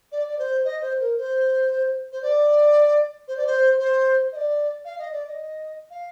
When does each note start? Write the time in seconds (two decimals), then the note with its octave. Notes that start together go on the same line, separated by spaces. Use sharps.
0.12 D5
0.28 D5
0.38 C5
0.64 D#5
0.81 C5
0.99 A#4
1.17 C5
2.12 C5
2.22 D5
3.27 C5
3.36 D5
3.46 C5
3.79 C5
4.32 D#5
4.36 D5
4.85 F5
4.98 D#5
5.12 D5
5.27 D#5
5.90 F5